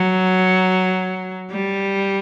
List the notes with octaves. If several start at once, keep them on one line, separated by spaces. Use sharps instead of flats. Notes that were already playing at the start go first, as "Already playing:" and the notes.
Already playing: F#3
G3